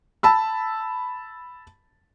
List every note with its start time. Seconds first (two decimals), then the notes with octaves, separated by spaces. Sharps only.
0.23 A5 B5 E6